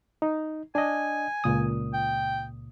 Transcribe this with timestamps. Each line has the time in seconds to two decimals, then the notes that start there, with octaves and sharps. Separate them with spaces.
0.22 D#4
0.75 D4 D#5 G#5
1.44 C#2 A#2 D#6
1.94 G5